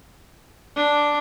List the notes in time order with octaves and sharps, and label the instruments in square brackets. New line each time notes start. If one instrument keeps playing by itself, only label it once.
[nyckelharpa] D4